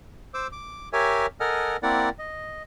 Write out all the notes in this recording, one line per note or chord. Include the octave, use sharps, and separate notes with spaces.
C5 D6 E6
D6
G4 A#4 C#5 E5 G#5
A4 A#4 D#5 F#5 G#5 F6
A#3 C4 E4 A#4 D5 F#5
D#5